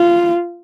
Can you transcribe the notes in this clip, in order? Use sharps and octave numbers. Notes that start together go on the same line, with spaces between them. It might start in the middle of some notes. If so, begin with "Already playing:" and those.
Already playing: F4